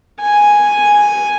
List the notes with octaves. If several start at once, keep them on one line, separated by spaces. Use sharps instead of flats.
G#5